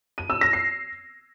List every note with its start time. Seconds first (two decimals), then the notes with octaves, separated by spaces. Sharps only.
0.18 D#7
0.30 E6
0.41 A#6
0.53 C7